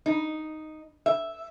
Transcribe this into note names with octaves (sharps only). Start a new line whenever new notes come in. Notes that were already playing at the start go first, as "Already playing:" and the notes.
D#4
E5